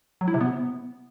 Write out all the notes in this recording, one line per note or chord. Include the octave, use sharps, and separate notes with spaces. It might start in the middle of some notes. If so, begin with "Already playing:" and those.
F#3
E4
C3
B3